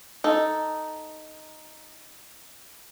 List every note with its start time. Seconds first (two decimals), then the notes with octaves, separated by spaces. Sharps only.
0.24 D#4 A4